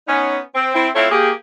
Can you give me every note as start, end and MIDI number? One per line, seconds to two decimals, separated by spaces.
0.07 0.37 59
0.07 0.37 61
0.07 0.37 63
0.55 0.73 60
0.74 0.88 60
0.74 0.88 64
0.95 1.08 57
0.95 1.08 60
0.95 1.08 64
0.95 1.08 65
0.95 1.08 69
0.95 1.08 73
1.11 1.30 58
1.11 1.30 67
1.11 1.30 68